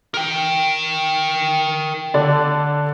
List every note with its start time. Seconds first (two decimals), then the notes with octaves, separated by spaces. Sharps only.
0.14 A#4 G5
2.14 D3 D5